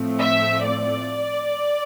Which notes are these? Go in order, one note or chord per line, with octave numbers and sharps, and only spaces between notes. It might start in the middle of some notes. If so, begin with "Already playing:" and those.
Already playing: A2 F3 A3 C4
E5
D5